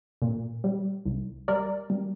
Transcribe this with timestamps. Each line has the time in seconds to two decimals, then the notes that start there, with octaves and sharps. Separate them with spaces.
0.22 A#2
0.64 G3
1.05 C2
1.48 G3 A#4 D5
1.90 G3